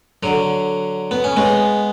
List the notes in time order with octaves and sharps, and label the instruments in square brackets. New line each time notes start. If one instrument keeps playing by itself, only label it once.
[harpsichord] D3 F#3
B3
C#4
G#3 B3